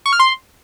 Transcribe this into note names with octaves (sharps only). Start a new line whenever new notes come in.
C#6
F6
C6